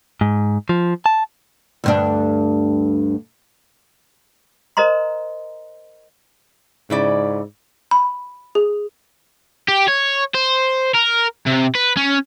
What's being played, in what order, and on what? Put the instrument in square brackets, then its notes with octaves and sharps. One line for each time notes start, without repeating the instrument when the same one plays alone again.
[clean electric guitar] G#2
F3
A5
[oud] D2 G2 D4
[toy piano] A#4 C5 D#5 A#5 C6
[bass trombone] G#2 [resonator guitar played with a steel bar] C#3 E4 D5
[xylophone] B5
G#4
[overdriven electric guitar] G4
C#5
C5
A#4
C3
B4
C#4